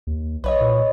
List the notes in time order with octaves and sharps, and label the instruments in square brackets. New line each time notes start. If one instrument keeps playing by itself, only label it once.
[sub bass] D#2
[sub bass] B1 [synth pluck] B4 C#5 D#5
[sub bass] A#2